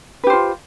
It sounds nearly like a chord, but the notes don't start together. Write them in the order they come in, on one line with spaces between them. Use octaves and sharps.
B4 G4 C5 F4